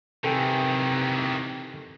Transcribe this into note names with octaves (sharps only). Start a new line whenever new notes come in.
C3 D#3 E3 A4 G5 G#5